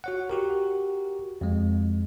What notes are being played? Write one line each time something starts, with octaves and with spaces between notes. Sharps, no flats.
F#4 C#5 F#5
F#4 G4 A#4
F2 G#3